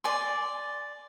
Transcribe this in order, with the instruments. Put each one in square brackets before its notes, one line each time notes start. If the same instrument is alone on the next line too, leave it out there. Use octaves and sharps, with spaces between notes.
[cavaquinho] D5 G#5 C6